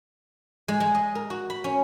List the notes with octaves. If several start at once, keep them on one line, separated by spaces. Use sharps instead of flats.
G#3
G#3
D#5
A#4
F#4
B5
C#4